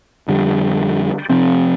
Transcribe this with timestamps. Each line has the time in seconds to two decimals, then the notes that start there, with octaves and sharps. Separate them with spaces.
0.28 F2 D3 G3
1.29 C3 F3 C4